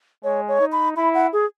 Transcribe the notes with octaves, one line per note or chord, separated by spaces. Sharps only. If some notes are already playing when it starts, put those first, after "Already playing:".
G#3 C#5
C#5
D#4
B5
E4 B5
F#5
G#4